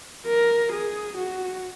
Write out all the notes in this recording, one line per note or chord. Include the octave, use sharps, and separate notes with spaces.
A#4
G#4
F#4